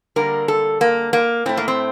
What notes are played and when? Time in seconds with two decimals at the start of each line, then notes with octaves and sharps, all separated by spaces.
0.16 D3 G3 A#3 A#4
0.48 A4
0.81 A#3
1.13 A#3
1.46 A2 A3 C4
1.57 A#3
1.68 C4